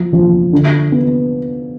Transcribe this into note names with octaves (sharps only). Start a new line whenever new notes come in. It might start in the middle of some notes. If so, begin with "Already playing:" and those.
Already playing: F3
F3
D3
B3